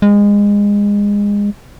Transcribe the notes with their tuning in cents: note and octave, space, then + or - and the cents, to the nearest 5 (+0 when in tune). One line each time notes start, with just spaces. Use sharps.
G#3 -25